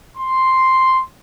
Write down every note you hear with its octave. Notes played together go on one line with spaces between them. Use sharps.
C6